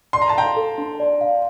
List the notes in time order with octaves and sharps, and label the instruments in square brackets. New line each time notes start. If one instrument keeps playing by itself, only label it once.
[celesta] D5 [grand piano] C6
[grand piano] A#5
A5
[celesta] F5 [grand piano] G5 A#5
[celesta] A4
D4
D5
F5